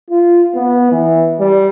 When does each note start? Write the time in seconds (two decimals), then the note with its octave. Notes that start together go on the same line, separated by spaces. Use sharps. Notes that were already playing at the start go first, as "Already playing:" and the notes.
0.10 F4
0.55 B3
0.92 E3
1.40 G3